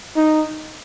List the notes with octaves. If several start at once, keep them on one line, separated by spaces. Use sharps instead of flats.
D#4